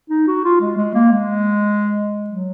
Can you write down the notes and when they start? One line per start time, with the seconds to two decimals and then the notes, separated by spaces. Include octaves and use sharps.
0.10 D#4
0.27 F#4
0.44 F4
0.61 G#3
0.77 G#3
0.95 A#3
1.12 G#3
2.30 F#3